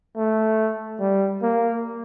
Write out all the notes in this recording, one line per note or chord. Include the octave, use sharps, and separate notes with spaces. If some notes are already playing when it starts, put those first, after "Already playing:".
A3
G3
A#3